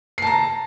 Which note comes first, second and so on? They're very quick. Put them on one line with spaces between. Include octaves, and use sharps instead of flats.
C7 A5 A#5